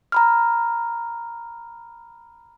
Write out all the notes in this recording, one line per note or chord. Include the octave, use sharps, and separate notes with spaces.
A#5 B5 F6